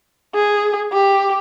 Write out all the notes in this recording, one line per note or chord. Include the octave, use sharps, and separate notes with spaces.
G#4
G4